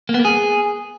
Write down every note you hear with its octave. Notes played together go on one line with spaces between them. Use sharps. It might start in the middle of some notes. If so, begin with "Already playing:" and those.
A#3
B3
A#3
G#4